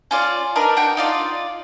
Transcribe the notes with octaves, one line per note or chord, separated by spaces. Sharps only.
C#4 F4 D5
D4 D#4 A#4 B4
D4 F#4 G5
D#4 F4 D5